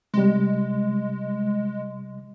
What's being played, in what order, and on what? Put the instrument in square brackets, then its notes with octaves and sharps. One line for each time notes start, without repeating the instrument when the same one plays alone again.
[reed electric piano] C3 G3 [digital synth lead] G#3